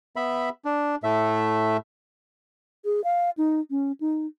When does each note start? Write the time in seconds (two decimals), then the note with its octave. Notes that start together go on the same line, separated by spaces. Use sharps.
0.16 B3 E5 B5
0.65 D4
1.04 A2 A3 E5
2.85 G#4
3.04 F5
3.38 D#4
3.71 C#4
4.01 D#4